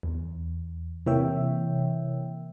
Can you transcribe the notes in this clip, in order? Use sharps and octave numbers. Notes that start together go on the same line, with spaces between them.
E2
C3 E3 A#3 C#5 E5 G5